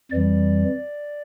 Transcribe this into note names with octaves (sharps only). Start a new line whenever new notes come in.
F2 E3 G3 D5